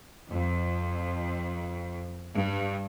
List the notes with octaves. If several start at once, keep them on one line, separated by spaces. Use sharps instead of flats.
F2
G2